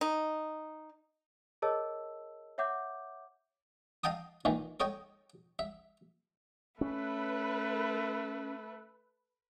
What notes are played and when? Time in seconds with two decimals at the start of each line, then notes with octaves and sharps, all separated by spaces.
0.01 D#4
1.62 G#4 A#4 C#5 D#5 A5 E6
2.58 C#5 E5 F#5 D6 G6
4.04 D#5 F5 G5 A5 D#6
4.45 A#2 D#3 E3
4.80 A4 C#5 D#5 G5
5.59 E5
6.81 A3 C#4 B4